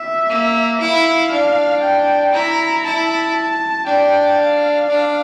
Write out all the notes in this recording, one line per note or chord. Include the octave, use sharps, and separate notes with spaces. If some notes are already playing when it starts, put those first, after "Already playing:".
Already playing: E5
A#3
E4 F5
D4
G5
E4 A#5
E4 A5
D4 G5
F5
D4